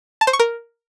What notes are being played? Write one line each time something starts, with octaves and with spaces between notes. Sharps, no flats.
A5
C5
C#6
A#4